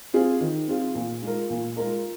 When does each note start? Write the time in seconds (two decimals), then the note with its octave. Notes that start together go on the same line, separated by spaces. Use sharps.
0.14 C4 F4 G#4
0.41 D#3
0.68 C4 F4 G#4
0.95 A#2
1.22 G#3 F4 A#4
1.50 A#2
1.77 G#3 F4 A#4